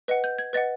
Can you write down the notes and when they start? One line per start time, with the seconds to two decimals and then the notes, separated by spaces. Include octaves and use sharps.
0.08 B4 D#5 F#5
0.24 G6
0.39 G#6
0.53 B4 D#5 F#5 A6